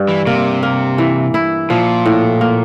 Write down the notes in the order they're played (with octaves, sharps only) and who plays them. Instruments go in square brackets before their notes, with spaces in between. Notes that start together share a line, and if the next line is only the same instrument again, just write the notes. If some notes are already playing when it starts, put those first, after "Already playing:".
Already playing: [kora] G2
[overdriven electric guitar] E3
[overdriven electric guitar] C3 [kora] A#3
[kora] A#3
E3
E4
[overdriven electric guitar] A#2 [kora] F3
[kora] A2
A#3